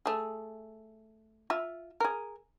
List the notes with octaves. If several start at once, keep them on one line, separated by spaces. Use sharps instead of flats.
A3 G#4
F4 E5
G#4 A#4